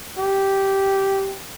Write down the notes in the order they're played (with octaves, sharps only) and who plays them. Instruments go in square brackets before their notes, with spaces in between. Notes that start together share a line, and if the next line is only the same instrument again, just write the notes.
[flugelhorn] G4